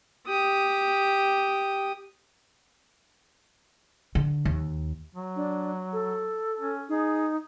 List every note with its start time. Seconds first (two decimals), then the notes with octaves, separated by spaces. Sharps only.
0.28 G4 D#6
4.15 D3
4.45 D#2
5.15 F#3
5.36 D4
5.93 A4
6.60 C#4
6.89 D#4 G#4